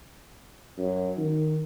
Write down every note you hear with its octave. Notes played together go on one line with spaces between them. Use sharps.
F#2
D#3